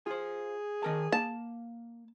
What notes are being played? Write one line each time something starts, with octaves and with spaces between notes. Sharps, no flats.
F4 G#4 C5
D#3 A#4 A5
A#3 A5